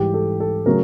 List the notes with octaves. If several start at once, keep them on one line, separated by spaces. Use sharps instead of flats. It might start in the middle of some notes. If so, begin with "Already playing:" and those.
Already playing: G#2 E3 G3 G4
A4
A4
C#3 F#3 A3 C#4 A#4